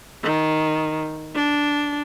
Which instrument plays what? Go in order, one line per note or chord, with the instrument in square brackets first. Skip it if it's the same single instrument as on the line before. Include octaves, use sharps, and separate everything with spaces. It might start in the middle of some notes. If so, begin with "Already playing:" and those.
[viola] D#3
D4